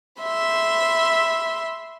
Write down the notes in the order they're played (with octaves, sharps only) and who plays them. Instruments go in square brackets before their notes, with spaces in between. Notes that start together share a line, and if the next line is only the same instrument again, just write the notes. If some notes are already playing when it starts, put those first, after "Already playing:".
[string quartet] E5 B5 C6